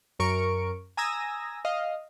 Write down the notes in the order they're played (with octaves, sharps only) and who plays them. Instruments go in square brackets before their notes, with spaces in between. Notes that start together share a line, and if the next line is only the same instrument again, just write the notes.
[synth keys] F#2 A#4 C#6 D7
G#5 A#5 D#6 E6 G#6 A#6
D#5 F5